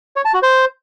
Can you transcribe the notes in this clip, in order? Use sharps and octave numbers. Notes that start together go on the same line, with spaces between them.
C#5
A5
F#4
C5